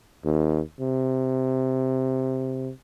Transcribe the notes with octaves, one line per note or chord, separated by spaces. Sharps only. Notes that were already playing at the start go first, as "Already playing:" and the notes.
D#2
C3